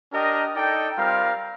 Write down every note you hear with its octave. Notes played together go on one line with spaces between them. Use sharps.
D4 G4 A#4 D#5 G5
D#4 A4 D5 G5
G3 C4 F4 A#4 F5